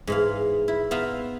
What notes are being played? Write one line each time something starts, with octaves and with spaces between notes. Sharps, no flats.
G#2 E3 F5
E4
B3 C5 E5 F5 A#5